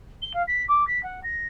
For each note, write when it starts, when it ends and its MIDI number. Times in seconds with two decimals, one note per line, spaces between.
0.22 0.33 103
0.33 0.42 77
0.47 0.63 95
0.68 0.86 86
0.87 1.01 95
1.03 1.22 78
1.23 1.47 94